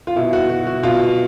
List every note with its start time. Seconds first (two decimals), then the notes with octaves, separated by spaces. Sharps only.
0.07 F4
0.16 B2 E4
0.33 F#4
0.50 F#4
0.67 F#4
0.83 B2 F4